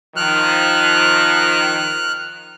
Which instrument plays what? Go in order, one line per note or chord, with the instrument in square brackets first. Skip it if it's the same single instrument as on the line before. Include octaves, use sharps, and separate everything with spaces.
[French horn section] D#3 F3 [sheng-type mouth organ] F6 F#6